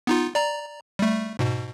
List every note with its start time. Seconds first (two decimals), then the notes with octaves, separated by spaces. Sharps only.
0.07 B3 D#4 F4
0.35 D5 A#5
0.99 G3 A3
1.39 G#2 B2